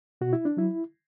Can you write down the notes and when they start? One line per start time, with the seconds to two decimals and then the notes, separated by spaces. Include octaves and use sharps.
0.21 B2 F#4
0.33 E4
0.45 D4
0.57 F#3 E4